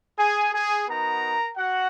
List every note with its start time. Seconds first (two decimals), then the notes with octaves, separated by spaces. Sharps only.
0.18 G#4 G#5
0.53 G#4 G#5
0.87 B3 D#4 F#4 A#4 A#5
1.57 F#4 F#5